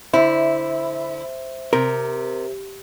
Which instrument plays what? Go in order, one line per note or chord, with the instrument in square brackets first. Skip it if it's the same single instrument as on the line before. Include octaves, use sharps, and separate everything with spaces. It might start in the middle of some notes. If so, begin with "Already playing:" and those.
[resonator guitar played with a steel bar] D3 E4 [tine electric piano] C5 E5
[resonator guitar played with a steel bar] C3 [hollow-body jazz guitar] A#4